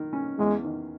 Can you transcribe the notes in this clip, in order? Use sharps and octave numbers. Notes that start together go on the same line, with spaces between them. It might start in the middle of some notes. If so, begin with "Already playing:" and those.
Already playing: D#3
C#4
E2 G#3
D#3